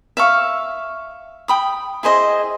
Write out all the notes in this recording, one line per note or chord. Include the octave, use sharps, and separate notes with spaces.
E5 F5 C#6
G5 B5 D#6
E4 G#4 C5 D#5